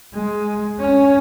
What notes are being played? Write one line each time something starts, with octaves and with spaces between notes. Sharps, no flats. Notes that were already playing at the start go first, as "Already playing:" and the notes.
G#3
C#4